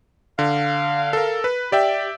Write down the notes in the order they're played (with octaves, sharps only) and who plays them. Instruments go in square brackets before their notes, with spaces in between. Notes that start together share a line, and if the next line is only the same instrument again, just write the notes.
[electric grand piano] D3 [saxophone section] F5
[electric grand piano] A4 A#4
B4
[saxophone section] G4 [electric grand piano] D5 E5 G5